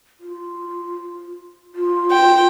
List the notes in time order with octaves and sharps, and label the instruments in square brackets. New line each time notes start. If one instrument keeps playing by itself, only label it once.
[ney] F4
F4
[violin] G5